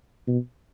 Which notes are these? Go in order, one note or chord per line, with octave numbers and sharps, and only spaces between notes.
B2